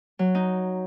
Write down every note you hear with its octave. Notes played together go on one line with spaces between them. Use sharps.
F#3
D#4